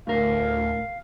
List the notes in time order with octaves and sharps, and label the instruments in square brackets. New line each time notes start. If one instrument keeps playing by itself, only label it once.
[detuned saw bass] D2 [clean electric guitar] A2 A#4 [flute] F5